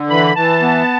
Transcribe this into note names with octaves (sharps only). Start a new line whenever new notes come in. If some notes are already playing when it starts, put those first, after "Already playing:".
Already playing: D3
E3 B5
E3 A5
B3